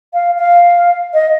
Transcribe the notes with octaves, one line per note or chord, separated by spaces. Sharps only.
F5
F5
D#5